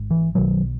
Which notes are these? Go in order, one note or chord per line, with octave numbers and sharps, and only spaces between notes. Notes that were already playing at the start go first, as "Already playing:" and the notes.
Already playing: G#1 G#2
E3
B1 B2 D#3 F#3